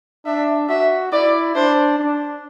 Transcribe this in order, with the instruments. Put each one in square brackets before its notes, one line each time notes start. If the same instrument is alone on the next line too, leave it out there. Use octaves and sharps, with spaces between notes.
[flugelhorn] D4 [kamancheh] E5
[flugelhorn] F#4 [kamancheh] E5
[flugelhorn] E4 [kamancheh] D5
[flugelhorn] D4 [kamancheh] C5
[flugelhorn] D4